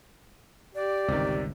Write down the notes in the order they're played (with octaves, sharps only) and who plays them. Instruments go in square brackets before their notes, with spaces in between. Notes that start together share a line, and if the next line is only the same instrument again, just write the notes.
[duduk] G4 [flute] D5
[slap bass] G1 C#2 [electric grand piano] C3 D#3